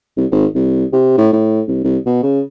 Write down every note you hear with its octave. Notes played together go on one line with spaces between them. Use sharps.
C2
G#1
C2
C3
A2
A2
C2
C2
B2
C#3